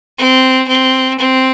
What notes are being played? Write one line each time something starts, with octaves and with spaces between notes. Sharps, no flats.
C4
C4
C4